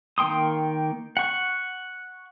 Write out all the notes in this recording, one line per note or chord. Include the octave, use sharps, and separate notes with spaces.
D#3 A#3 G5 C6 D#6
F#5 C#6